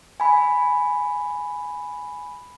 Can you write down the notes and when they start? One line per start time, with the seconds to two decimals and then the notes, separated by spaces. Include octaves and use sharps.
0.20 G#5 B5